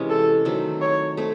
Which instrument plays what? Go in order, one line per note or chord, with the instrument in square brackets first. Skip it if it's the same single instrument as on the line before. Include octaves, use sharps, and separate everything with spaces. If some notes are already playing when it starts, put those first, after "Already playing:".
Already playing: [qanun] C3 E3 G#3 C#4
[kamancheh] A4
[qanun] D#3 F#3 A3 C4
[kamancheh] C#5
[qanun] A3 C4